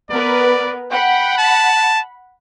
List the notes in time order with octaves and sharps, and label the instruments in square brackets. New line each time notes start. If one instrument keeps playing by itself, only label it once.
[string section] B3 A#4 B4 [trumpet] D5
[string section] F#5 B5 [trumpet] G5
[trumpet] A5